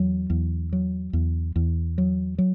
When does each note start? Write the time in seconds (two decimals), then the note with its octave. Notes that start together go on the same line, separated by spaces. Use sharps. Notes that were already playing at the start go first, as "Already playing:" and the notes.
Already playing: E2 F#3
0.30 E2
0.73 F#3
1.13 E2
1.56 E2
1.98 F#3
2.38 F#3